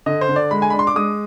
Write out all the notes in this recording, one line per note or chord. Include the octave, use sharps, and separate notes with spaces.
D3 D#5
C5
D3
D5
G#3 B5
G#5
D4 B5
C6
D6
G#3 D#6